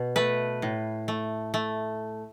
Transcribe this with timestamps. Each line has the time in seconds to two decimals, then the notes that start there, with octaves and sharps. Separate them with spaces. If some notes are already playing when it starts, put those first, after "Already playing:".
Already playing: B2
0.16 A3 B4
0.62 A2
1.08 A3
1.54 A3